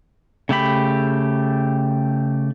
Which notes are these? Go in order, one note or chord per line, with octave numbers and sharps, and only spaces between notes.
C#3 A3 G4 B5